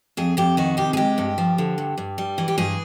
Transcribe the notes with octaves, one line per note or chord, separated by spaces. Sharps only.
F2 G#4
F2 G4
D#3 F#4
C3 G4
G#4
G#3 G4
G2
F3
D3
G2
G2
G3
E3
G4
G2 G#4